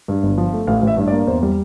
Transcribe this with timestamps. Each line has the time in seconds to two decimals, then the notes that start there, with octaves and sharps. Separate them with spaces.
0.08 G2
0.23 G1
0.38 F3
0.53 A3
0.67 A1 F5
0.82 A1 E5
0.97 G2
1.07 D5
1.12 A#3
1.27 E2 C5
1.43 G3